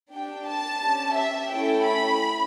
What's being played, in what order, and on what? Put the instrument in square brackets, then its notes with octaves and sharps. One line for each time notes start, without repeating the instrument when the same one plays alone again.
[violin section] D4 G4 G5
A5
C#4 G4
E5
A3 C#4 E4 A4 G5
B5